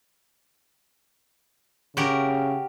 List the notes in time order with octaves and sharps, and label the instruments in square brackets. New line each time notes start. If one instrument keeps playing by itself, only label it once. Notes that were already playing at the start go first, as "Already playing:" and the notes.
[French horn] C#3 [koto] F#4 G4 A#4